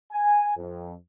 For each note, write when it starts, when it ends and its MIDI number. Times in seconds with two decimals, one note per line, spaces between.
0.13 0.53 80
0.57 0.94 41